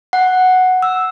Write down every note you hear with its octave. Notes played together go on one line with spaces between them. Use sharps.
F#5
E6